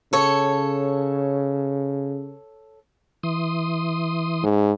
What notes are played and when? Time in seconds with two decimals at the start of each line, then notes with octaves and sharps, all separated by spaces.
0.13 C#3 A4 C#5
3.23 E3 C6 D#6
4.43 G#2